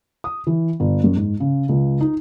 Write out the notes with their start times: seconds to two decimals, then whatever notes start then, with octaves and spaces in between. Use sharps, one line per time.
0.24 D#6
0.47 E3
0.80 G1
1.04 F#2
1.16 G#2
1.40 C#3
1.69 C#2
2.01 D#4